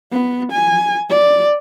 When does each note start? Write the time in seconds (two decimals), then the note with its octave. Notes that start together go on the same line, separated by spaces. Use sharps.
0.13 B3
0.52 G#5
1.10 D5